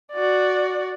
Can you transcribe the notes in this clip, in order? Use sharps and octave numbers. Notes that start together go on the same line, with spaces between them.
F#4 D5